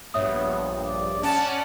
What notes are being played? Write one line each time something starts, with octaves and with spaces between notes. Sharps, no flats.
A#1 G2 B3 C#5 E5 D#6
D5
C#4 D5 F#5 A5